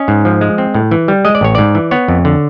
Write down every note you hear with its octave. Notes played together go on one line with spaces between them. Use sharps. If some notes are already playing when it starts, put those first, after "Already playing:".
Already playing: C#4 D#5
G#2
F3
G#3
C4
A2
E3
G3
G#3 D#5
D5
A1 C#5
G#2 D5
E3
B3 C#5
F2
D3